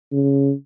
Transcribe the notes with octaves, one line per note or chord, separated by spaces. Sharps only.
C#3